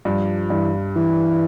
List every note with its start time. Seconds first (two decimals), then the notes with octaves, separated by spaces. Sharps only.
0.05 G2 F3
0.50 G2 E3
0.96 E3